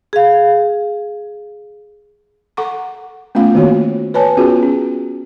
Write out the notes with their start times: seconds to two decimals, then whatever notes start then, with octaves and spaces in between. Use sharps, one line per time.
0.13 G#4 F5
2.57 A4 F#5 A#5 C#6 D6
3.35 A3 B3 C#4 F4 F5
3.55 D#3 A#3 F#4 C#5
4.14 B4 C#5 D5 G#5 A5
4.37 B3 C#4 F4 F#4 G#4
4.63 C#4